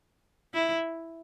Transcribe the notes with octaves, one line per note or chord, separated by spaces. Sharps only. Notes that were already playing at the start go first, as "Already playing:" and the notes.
E4